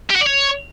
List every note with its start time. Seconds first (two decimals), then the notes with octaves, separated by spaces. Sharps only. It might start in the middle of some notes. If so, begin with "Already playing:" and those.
0.10 G4
0.16 F#4
0.21 D5
0.27 C#5